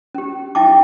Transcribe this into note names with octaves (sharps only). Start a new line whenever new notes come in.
C#4 G4
D#4 E4 E5 G5 A5 D6